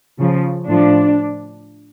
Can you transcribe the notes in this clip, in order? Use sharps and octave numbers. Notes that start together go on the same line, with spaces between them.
C#3 F3
A2 F3 D4